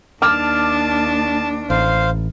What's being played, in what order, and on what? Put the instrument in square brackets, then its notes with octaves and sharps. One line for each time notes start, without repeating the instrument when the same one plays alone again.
[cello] D#2 D4 [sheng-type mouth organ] A5 [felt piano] D6 F6
[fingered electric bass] A1 [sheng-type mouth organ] C5 F5